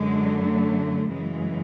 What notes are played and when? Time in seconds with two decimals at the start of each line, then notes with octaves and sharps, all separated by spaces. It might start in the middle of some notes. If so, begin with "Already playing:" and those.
Already playing: F#2 D3 F#3 G#3
0.40 A3
1.11 F#2 C#3 E3 G#3